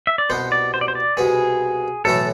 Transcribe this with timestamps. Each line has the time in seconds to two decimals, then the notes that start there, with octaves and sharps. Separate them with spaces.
0.07 E5
0.18 D5
0.30 C2 B2 B3 C5
0.52 D5
0.74 C5
0.81 D5
0.88 C5
0.95 D5
1.17 C2 B2 B3 G#4
2.05 B1 A2 E3 A3 E4 A4